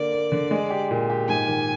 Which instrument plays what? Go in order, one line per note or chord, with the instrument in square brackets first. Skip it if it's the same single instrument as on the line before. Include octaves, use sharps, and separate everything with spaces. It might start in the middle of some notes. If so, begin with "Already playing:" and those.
Already playing: [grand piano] D3 A#3 [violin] D5
[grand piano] A#3
D3
G#3
G4
A#2
G4
[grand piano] G#2 [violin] G#5
[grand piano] D#3